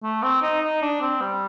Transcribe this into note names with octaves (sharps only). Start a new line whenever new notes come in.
A3
C4
D#4
D#4
D4
C4
G3